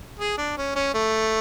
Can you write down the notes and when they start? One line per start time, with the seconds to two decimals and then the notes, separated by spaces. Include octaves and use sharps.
0.19 G#4
0.38 D4
0.57 C#4
0.75 C#4
0.94 A3